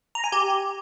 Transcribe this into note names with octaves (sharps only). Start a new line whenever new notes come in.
A#5
G#5
G4